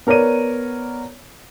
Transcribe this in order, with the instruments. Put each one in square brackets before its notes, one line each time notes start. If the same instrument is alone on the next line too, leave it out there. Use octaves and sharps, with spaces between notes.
[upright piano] B3 A#4 C#5 D5 D#7